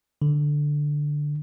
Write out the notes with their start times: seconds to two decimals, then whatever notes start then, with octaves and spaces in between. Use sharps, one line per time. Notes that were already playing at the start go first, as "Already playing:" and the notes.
0.22 D3